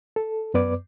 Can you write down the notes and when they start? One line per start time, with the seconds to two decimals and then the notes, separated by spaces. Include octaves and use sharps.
0.16 A4
0.54 F#2 B3 B4 D5 D6